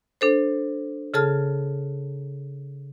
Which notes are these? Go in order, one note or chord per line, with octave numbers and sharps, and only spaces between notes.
D4 A4 C5
C#3 G#4 A4 A5 F6